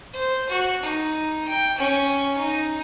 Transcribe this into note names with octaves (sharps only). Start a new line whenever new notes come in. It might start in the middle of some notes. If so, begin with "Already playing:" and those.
C5
F#4
D#4
G5
C#4
D#4